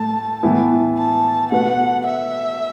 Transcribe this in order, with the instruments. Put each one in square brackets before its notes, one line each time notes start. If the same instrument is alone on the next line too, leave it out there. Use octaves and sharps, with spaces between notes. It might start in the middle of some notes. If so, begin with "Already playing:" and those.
Already playing: [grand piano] A2 A3 [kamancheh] A5
[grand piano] A2 E3 B3 E4
[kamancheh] A5
[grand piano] B2 A3 F#4 B4 [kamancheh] F#5
[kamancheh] E5